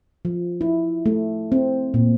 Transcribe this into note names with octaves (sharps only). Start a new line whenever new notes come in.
F3
E4
A3
C4
A#2